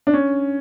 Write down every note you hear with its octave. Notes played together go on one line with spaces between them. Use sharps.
D4
C#4